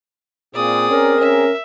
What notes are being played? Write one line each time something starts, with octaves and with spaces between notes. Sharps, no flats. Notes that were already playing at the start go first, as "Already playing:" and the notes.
A#2 C4 G#4 D5 D#6
C#4 A#4
C#4 E5